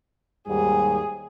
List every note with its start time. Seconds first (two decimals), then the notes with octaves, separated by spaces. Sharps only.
0.48 D#2 G#2 G3 G#4